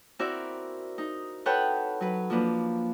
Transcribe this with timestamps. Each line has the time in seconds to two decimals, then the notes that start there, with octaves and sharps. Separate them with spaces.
0.19 C4 E4 F#4 A#4 D5 E5
0.98 D#4
1.46 A4 B4 C#5 F#5 G5 F#6
2.00 F#3 B4
2.30 F3 A#3 D4 B4